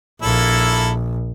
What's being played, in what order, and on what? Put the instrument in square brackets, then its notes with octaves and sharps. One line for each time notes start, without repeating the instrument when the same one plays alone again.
[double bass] A#1 [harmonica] A#3 E4 A4